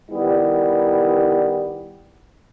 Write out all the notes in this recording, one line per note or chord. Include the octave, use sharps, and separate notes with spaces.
D#3 G3 B3 E4